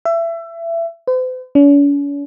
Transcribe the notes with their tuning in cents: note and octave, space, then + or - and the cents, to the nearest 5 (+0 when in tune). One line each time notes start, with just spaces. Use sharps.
E5 +25
C5 -45
C#4 +45